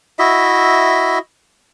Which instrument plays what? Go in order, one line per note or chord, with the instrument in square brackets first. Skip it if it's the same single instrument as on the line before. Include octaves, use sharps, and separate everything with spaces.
[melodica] E4 F#4 D#5 E5